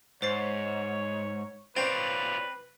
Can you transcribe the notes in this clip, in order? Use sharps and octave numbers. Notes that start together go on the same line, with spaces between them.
G#2 C5 C#5 A6 C7
C4 F4 B4 C#5 D5 G5